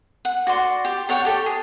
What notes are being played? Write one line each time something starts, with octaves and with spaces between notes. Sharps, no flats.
F#5
F#4 D5 C6
G4
A4 C#5 F#5 G5
G4 A4
G#4